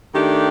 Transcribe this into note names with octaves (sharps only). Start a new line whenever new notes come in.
D#3 A3 D4 G4